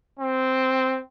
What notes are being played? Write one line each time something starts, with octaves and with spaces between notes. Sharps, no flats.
C4